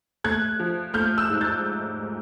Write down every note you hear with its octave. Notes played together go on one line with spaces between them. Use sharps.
A3 F#6 G#6
F3
A3 F6 G6
E6 F#6
G#2
G6 A6